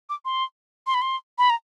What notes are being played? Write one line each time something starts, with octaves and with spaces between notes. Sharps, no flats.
D6
C6
C6
B5
C6
B5
A#5